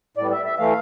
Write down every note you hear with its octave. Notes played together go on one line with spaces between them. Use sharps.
A2 G3 B3 D5
E5
E5
E3 A3 F5